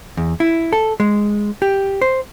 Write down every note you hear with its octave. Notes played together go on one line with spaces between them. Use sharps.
E2
E4
A4
G#3
G4
C5